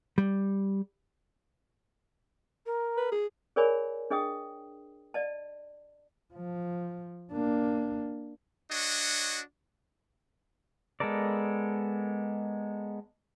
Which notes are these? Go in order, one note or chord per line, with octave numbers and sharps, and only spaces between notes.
G3
A#4
B4
G#4
G#4 A#4 C#5 D5 G#5 B5
D4 G#4 D#5 G5 D#6
D5 D#5 A5
F3
A#3 D4
D4 F#4 C#5 D#5
G#3 B3 A4 A#4 D5